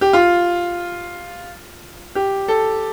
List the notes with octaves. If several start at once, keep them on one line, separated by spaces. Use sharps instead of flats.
G4
F4
G4
A4